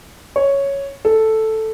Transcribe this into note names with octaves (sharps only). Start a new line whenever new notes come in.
C#5
A4